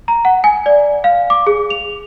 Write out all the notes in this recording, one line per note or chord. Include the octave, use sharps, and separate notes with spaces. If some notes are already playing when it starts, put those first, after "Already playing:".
A#5
F#5
G#5
D5
F5
D6
G#4
F7